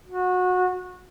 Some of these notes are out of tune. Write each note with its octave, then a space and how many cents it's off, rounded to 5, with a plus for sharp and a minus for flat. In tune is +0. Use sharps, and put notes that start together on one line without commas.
F#4 -25